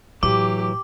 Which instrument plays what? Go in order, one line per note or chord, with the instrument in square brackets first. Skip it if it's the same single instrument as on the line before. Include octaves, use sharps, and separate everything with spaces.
[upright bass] A2 [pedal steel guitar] E3 F#3 [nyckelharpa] G4 [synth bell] D6